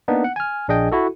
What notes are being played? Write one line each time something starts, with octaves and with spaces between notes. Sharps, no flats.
A#3 B3 D4 D#4
F#5
G#5 F6
A#1 D4 G#4 D#5 G5
E4 F#4 A4